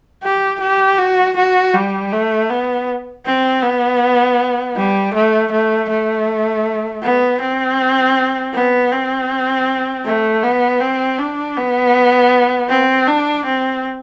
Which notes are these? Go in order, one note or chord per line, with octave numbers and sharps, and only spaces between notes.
G4
G4
F#4
F#4
G3
A3
B3
C4
B3
G3
A3
A3
A3
B3
C4
B3
C4
A3
B3
C4
D4
B3
C4
D4
C4